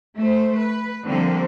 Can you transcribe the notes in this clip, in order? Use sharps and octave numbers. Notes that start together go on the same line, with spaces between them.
A3 C5
B4
D3 F3 G3 A#3 C4